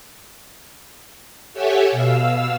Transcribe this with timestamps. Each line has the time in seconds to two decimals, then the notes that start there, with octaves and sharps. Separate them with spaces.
1.53 G4 A4 C#5 E5 F#5 G#5
1.92 B2 F5 E6